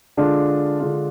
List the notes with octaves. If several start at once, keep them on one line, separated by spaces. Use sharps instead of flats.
D3 G#3 D4 F4
D3 G#3 D4 F4